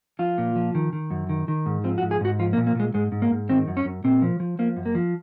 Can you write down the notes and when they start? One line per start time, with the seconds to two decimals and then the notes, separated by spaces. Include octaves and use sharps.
0.19 F3 F4
0.38 A#2
0.56 F3
0.75 D#3
0.93 D#3
1.10 F#2
1.29 D#3
1.48 D#3
1.66 G#2
1.84 F3 C4
1.98 F#4
2.03 G#2
2.11 G#4
2.21 G#2 F#4
2.39 F3 F4
2.53 A#3
2.57 A#2
2.67 A#3
2.75 A#2 G#3
2.94 G#2 G#3
3.12 G#2
3.22 A#3
3.31 G#2
3.49 D#3 C4
3.68 F#2
3.77 C#4
3.85 F#2
4.04 A#2 C4
4.22 F3
4.40 F3
4.59 F3 A#3
4.77 F#2
4.86 A#3
4.95 F3